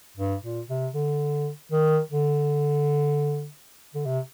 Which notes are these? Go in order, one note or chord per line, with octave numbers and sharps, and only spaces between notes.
G2
A#2
C3
D3
D#3
D3
D3
C3